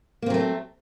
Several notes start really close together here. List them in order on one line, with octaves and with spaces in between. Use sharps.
A#3 C4 F#3 A3